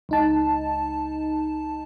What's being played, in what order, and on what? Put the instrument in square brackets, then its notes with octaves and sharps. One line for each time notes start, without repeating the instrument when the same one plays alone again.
[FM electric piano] C#2 D#4 A5